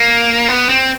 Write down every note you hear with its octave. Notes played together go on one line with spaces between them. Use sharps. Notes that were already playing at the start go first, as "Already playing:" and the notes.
Already playing: A#3
B3
C4